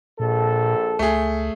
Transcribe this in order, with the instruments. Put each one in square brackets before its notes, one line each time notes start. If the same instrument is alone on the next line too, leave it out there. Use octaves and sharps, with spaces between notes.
[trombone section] A#1 A4 [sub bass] A#2
[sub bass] C#2 [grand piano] A3 G#4